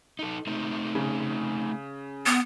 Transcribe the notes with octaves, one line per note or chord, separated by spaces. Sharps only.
D#4 A4
A3 C4 D#4
C#3
B3